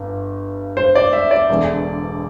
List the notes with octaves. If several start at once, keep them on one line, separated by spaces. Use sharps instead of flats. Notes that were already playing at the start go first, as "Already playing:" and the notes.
Already playing: G1 G2
C5
D5
E5
D5
E1 E2 D3